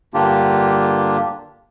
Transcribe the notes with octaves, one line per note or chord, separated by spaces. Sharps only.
G2 D3 A#3 D4 F4 G4